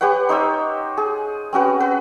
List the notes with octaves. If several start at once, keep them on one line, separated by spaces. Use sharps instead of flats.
G4 B4 C#5 F#5
D#4 C5 C#5 E6
G#4
C4 C#4 F#4 B4
B4